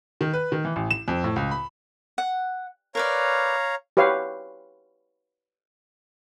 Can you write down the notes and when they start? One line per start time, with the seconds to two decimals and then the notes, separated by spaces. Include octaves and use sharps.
0.21 D#3
0.33 B4
0.52 D#3
0.65 E3
0.76 A1
0.91 E7
1.08 F2
1.24 A2
1.36 C#2
1.51 B5
2.18 F#5
2.95 A#4 B4 C#5 D5 F5 A#5
3.97 G4 B4 C#5 F5